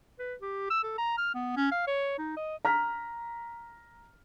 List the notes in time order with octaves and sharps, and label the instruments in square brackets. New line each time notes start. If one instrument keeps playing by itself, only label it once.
[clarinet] B4
G4
E6
A4
A#5
F6
B3
C#4
F5
C#5
D#4
D#5
[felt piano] A#5 F6 B6